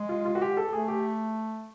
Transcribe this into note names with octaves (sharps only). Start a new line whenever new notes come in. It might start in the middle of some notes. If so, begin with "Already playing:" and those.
Already playing: G#3
F4
F4
F#4
G4
A4
A3 G#4
G4